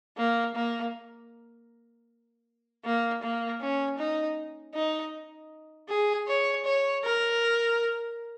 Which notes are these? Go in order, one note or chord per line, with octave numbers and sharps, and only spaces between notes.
A#3
A#3
A#3
A#3
C#4
D#4
D#4
G#4
C#5
C#5
A#4